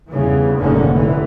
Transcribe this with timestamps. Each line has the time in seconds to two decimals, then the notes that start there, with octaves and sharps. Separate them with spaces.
0.10 E2 G2 C#3 E3
0.58 F1 G#2 D3 D#3 A#3 C#4
0.92 F1 A#1 E3